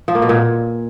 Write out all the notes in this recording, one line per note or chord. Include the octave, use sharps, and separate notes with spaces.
F3
A#3
B2
A#2